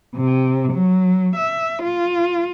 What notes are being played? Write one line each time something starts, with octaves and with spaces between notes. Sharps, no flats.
C3
F#3
E5
F4